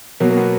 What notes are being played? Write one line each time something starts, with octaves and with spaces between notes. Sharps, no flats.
B2 F#3 A#3
A#3
B3